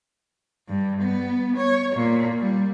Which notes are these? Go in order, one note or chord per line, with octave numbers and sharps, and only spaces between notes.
G2
B3
C#5
A#2
G3